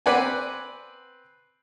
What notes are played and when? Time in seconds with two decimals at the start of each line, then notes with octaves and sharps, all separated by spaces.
0.06 C4 B4 D5 F#5 G#5